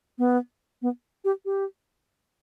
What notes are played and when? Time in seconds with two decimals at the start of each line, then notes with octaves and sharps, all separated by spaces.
0.18 B3
0.82 B3
1.25 G4
1.45 G4